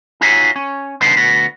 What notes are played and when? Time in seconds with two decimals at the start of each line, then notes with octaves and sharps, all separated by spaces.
0.21 D#4 F4 F#4 G#4 C#5 E5
0.56 C#4
1.01 C#3 G3 B3 D4 D#4 C5
1.16 D2 B3 F#4